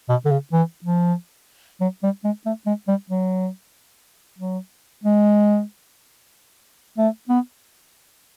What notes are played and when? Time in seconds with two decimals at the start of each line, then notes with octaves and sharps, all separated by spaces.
0.09 B2
0.25 D3
0.31 C#3
0.52 E3
0.85 F3
1.81 F#3
2.03 G3
2.24 G#3
2.46 A3
2.66 G#3
2.88 G3
3.10 F#3
4.39 F#3
5.04 G#3
6.98 A3
7.29 B3